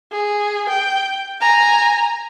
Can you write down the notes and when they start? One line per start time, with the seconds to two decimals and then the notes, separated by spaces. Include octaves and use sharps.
0.12 G#4
0.69 G5
1.41 G#5 A#5